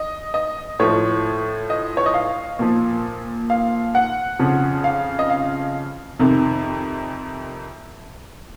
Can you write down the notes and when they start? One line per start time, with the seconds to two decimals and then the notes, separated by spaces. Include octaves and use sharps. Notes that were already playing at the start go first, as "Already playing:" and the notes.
Already playing: D#5
0.34 D#5
0.79 A2 F3 C#5
1.70 D#5
1.97 C#5
2.06 D#5
2.14 F5
2.59 A#2 F3
3.50 F5
3.95 F#5
4.39 F2 C#3 F3
4.84 F5
5.19 D#5
5.30 F5
6.19 F2 C3 D#3